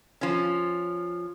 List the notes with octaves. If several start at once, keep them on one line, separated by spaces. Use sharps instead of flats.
F3 C#4